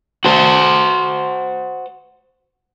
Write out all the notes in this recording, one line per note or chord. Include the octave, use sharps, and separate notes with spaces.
F#4 C5